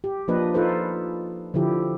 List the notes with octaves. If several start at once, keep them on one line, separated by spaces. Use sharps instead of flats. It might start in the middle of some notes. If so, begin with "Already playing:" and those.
G4
F3 A#3 D4 B4 D#5
D#4 F4 A4 B4 C5
D3 F3 E4 G4